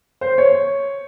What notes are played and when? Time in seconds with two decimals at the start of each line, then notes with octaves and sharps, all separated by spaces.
0.21 C5
0.38 C#5